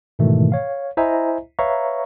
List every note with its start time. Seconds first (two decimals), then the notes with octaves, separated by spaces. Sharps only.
0.19 G#2 B2 D#3 E3 A3
0.52 C#5 F5
0.97 E4 C5 D#5 E5 G#5 A#5
1.59 B4 C#5 E5 F5 A#5 C#6